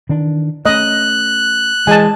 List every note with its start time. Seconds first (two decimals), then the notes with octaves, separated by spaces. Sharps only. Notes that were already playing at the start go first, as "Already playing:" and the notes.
0.09 D#3 E3 D4
0.65 A3 C#4 D#5 F#6
1.87 E3 G#3 G#5 A5